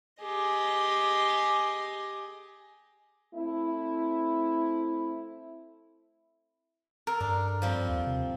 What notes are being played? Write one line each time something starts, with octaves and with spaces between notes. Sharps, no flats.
G4 G#4 D#5
A3 C4 E4
A4 A#4
G2 D4
F3 G3 C4
D#2
C3